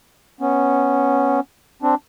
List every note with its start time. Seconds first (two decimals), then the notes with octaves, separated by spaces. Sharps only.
0.40 B3 C#4
1.82 C4 D4